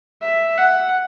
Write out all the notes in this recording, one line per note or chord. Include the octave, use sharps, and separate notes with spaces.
E5
F#5